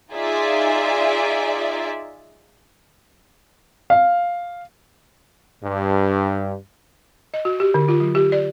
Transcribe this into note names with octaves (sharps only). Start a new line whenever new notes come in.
D#4 F4 G#4 D5 E5
F5
G2
D#5
F#4
G4
D3
F4
F#3
G4
D5